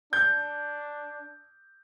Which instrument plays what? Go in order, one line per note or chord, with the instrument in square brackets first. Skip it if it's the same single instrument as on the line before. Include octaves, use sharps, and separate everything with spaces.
[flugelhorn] D4 [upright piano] G6